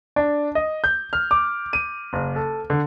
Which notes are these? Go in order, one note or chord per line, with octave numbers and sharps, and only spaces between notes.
D4
D#5
G6
F6
D6
D#7
F#1
A4
D3